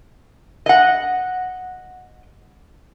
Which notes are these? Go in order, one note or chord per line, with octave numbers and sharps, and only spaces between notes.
D#5 F#5